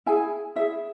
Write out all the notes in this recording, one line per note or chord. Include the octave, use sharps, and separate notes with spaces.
E4 G#4 G#5
E4 G#4 E5